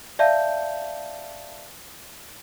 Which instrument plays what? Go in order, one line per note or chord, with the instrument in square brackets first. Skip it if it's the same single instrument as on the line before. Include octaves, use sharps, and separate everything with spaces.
[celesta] D5 E5 F5 A5 G6